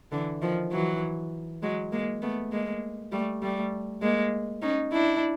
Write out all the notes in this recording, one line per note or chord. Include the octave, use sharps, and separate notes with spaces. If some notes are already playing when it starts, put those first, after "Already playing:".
D3 E3
D#3 F3
E3 F#3
F#3 G#3
G#3 A#3
A3 B3
G#3 A#3
G3 A3
G3 A3
G#3 A#3
C#4 D#4
D4 E4